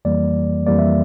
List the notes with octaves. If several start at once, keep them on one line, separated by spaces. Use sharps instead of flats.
F2 E3 G3 A#3 D5
F2 E3 G3 A#3 D5
E5